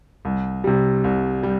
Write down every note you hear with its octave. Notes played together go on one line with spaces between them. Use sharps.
C2
C3 G3
C2
G3